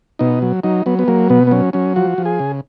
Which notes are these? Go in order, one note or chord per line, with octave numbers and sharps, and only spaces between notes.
B2 D#4
F#3
F#3 D#4
F#3 B3
B3
F#3 A#3
B2 B3
B3
F#3 C#4
F#3 C#4
F3 F#4
F3
G#4
C#3